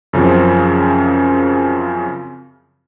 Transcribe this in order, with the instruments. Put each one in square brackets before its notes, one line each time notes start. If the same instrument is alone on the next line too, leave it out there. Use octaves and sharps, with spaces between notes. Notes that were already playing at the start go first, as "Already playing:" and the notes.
[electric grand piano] F#2 C#3 F3 C4